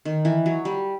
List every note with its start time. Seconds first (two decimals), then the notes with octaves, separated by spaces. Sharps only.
0.05 D#3
0.25 E3
0.46 F#3
0.65 G3